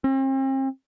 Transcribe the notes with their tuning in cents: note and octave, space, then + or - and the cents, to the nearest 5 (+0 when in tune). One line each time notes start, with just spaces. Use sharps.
C4 +40